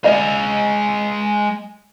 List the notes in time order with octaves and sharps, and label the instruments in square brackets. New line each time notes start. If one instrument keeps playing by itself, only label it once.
[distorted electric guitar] G#3 F5 [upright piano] D#5